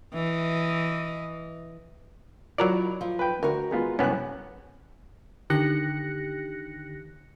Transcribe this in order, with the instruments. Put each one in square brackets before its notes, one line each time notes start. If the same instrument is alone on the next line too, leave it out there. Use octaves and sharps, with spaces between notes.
[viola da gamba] E3 D#5
[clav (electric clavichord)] F#3 A#4 D5 [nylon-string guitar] E4 F4 D#5
[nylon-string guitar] F3
[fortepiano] B4 G5
[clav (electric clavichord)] D2 [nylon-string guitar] F#4 A#4
[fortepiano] G#3 B3 F4
[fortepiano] C2 F#6 [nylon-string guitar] F#2 [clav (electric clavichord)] B3 C#4
[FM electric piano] D3 D#3 G4 F#6 A#6 C#7